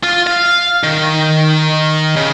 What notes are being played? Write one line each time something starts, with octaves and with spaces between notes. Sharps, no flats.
F4
F5
D#3
C#3